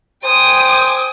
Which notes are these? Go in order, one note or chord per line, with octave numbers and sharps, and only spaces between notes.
C5 G5 G#5 D#6